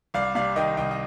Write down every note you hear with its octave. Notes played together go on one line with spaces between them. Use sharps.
C2 D5 F5
C3 D5 F5
D#3 D#5 G5
C2 D#5 G5
D#5